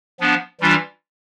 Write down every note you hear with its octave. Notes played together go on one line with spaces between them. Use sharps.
F3 B3 D4
E3 G3 D4 F4